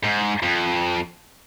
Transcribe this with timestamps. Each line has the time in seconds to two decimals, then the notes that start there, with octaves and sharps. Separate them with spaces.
0.03 G#2
0.43 F2